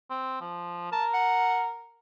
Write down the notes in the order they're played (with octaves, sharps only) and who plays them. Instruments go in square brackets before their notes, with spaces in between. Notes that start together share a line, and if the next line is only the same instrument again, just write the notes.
[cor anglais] C4
F3
[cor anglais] A#4 [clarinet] A5
[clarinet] F#5